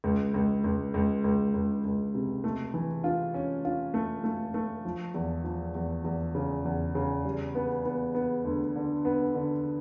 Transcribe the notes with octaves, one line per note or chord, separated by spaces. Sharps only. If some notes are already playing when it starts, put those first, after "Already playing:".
C#2
C#2
C#2
C#2
C#2
C#2
C#2
C3
A3
E3
F4
C#4
F4
A3
A3
A3
F3
E2
F3
E2
E2
C#3
E2
C#3
G3
B3
B3
B3
D2
D3
B3
D3